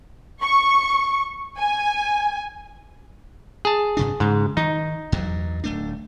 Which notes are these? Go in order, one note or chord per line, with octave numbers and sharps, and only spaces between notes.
C#6
G#5
G#4 A5
G2 C3 D4
G#2 C#3
D#3 D#4
E2 G2 F#3
D1 A3 D4